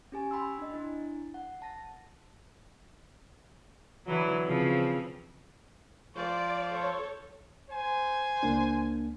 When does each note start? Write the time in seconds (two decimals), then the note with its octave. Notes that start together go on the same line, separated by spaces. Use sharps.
0.12 C#4 G4 G#5
0.31 G5 B5 C6 E6
0.59 D4 D#5
0.74 D4 E4
1.34 F#5
1.62 A5 A#6
4.06 D3 E3 F#3
4.45 C#3 F3 C4
6.16 F3 F4 C5 D5
6.73 A4 C#5
7.70 C5 G#5
8.43 C#2 A#3 D4